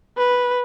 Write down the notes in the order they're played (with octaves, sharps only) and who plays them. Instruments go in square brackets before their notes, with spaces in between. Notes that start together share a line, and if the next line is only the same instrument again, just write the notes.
[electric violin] B4